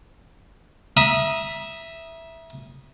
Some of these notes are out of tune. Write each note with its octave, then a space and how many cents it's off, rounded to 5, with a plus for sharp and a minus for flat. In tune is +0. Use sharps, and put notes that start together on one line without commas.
E5 +0 A#5 +40 D#6 +0